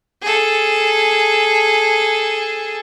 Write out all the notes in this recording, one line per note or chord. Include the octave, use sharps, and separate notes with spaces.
G#4 A4